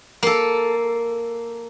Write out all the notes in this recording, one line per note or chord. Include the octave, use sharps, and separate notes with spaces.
A#3 A4